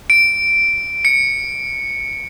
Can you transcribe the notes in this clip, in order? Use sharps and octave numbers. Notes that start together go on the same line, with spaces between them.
D7
C#7